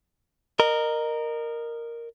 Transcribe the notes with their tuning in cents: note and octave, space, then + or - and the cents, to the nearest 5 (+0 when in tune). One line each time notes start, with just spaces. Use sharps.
A#4 +0 D#5 -25